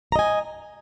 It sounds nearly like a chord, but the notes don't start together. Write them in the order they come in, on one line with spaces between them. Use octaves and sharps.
A#5 D#5 G#5